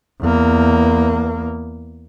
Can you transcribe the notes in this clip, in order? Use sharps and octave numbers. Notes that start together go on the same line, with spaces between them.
E2 A#3